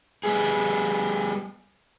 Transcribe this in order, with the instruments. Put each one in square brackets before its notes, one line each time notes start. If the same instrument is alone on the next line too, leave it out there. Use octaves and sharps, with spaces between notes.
[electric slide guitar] G3 B3 G#4